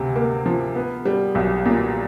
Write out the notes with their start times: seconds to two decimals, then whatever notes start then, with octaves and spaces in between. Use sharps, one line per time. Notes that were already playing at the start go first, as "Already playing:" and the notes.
Already playing: D2 C3
0.16 A#3
0.46 F3
0.75 B3
1.05 G3
1.35 B1
1.66 A#2